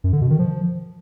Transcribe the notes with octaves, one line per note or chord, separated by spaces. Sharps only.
F#2
D3
B2
D#3
F3